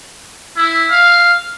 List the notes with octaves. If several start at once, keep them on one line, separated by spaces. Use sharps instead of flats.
E4
F5